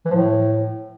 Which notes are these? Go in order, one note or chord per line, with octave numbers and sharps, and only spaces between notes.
E3
F3
A2